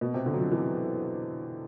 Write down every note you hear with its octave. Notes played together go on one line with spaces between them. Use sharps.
B2
C3
D3
F#3
F3
E3